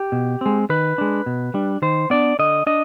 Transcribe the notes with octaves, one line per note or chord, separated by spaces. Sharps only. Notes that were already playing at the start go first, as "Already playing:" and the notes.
Already playing: G4
B2
G#3 C4
D#3 B4
G#3 D4
B2
G3 D4
D#3 C5
B3 D4 D5
D3 D#5
D4 D#5